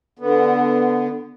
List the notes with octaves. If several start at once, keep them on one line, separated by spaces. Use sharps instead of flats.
D3 B3